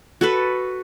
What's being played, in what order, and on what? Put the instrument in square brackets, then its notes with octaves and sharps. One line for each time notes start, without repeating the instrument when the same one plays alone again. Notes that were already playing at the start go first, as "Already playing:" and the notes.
[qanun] F#4 A4 B4